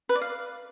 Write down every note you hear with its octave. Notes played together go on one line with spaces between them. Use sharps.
B4
D5
F5